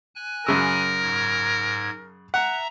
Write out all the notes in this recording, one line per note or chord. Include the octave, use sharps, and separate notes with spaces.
G#5 F#6
F#2 C#3 A#4 E6
G#2 G#6
E5 F#5 A#5